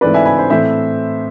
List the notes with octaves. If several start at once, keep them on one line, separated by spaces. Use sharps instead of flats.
G#2 E3 A3 C4 B4 D5
E5 G#5
G#5 B5
C5
A2 E3 A3 C4 C5 E5